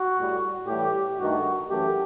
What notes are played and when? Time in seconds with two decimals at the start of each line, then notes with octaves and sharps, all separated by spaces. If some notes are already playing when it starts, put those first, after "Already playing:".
Already playing: F#4
0.17 A2 G3
0.67 A2 E3 G3 G4
1.18 G2 D#3 A3 F#4
1.70 F#2 E3 A3 G4